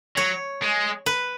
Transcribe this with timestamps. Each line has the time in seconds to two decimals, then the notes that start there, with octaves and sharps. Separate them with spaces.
0.17 F#3 C#5
0.62 G#3
1.06 B4